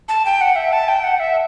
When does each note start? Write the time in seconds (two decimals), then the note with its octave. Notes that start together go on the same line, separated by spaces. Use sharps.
0.09 A5
0.25 G5
0.41 F#5
0.56 E5
0.73 A5
0.88 G5
1.04 F#5
1.20 E5